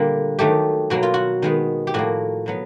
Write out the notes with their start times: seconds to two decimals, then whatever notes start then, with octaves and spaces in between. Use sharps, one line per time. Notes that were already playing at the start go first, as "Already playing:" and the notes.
Already playing: A#2 D3 G3 A#3
0.39 D#3 F#3 A3 G4
0.90 B2 F#3 A#3 F#4
1.03 F4
1.14 F#4
1.42 D#3 G#3 B3
1.87 G4
1.94 A2 F3 A#3 F#4
2.46 B2 F#3 B3